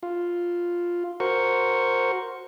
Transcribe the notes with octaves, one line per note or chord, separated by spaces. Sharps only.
F4
F#4 A#4 C5 C#6